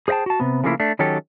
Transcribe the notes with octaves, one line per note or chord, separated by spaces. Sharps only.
G#4 C5 D#5 G5 A5
F#4 A5
C3 B3
C#3 F3 A3 A#3 C#4 E4
A3 D4
D#3 F#3 C#4 G4 A4